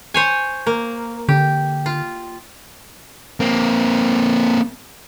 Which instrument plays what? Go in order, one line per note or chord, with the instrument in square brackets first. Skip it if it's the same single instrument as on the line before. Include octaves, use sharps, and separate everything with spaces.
[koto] C5 C#5 G#5
A#3
[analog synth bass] D3 [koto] G4
[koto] F4
[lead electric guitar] A#3 C4